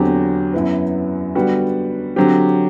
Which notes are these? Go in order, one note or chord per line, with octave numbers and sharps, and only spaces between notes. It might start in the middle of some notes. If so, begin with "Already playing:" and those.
Already playing: E2 D3 F#3 C4 G4
F#2 F#3 B3 E4 B4
D3 G3 B3 F#4
D3 F#3 C4 G4